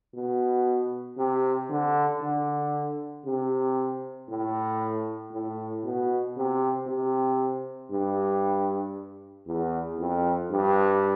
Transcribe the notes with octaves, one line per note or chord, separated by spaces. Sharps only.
B2
C3
D3
D3
C3
A2
A2
B2
C3
C3
G2
E2
F2
G2